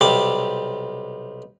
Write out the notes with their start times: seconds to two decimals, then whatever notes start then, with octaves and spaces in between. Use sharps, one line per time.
0.01 B1 C3 G3 G5 D6